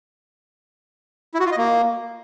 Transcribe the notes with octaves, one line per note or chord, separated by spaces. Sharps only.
E4
F#4
F4
D#5
A#3